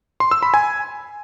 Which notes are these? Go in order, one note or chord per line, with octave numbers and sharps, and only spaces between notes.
C6
E6
B5
G#5